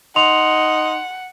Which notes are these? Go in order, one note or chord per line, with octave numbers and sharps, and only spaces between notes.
D#4 F#5 C6 F7